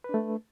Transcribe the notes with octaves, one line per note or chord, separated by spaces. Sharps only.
A3 D4 B4